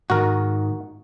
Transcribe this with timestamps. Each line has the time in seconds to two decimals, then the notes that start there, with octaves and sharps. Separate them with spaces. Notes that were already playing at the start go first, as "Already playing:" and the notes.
0.10 G#2 D#3 F#4 A#4